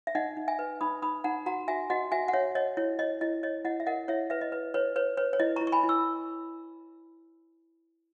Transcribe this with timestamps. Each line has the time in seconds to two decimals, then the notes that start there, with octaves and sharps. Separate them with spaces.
0.07 E5
0.15 D#4 D#5 F#5
0.37 D#4
0.48 E5 G#5
0.59 B4
0.81 D#4 B5 D#6
1.02 D#4 B5 D#6
1.24 D#4 F#5 A#5
1.46 F#4 F#5 A#5
1.68 F#4 E5 G#5
1.90 F#4 D#5 F#5
2.12 F#4 E5 G#5
2.28 F#5
2.33 C#5 E5
2.55 C#5 D#5
2.77 E4 C#5
2.99 C#5 D#5
3.21 E4 D#5
3.43 C#5 D#5
3.65 E4 D#5 F#5
3.80 E5
3.86 A#4 D#5 F#5
4.08 E4 C#5 E5
4.30 B4 E5
4.41 D#5
4.52 B4
4.74 B4 C#5
4.96 B4 C#5
5.17 B4 C#5
5.33 C#5
5.39 E4 D#5
5.56 A#5 C#6
5.61 E4
5.67 C#6
5.72 G#5 B5
5.83 E4
5.89 C#6 E6